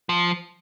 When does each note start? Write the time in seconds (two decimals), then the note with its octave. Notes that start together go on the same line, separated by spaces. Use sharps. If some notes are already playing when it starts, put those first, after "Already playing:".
0.09 F3